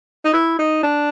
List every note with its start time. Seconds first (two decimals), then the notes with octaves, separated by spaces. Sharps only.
0.25 D#4
0.33 E4
0.59 D#4
0.83 D4